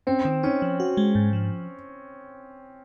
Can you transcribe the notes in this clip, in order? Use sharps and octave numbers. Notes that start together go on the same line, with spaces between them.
C4 C#4
D#3
C#4 D#4
F3
F#4
G#3
G#2
F3